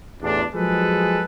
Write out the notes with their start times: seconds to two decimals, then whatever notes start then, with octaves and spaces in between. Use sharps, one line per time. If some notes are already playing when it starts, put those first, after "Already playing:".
0.22 A1 E2 D4
0.54 F3 F#3 G#3 G#4 A4 B4